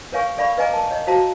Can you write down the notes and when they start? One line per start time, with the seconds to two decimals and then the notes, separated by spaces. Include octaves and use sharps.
0.12 A#4 B4 C#5 F5 G#5 C#6
0.38 A4 D5 F5 B5 C#6
0.58 B4 D#5 F5 G#5 A#5 D6
0.73 A#4 A5
0.91 C#5 D#5
1.07 F#4 C5 F5 A5 A#5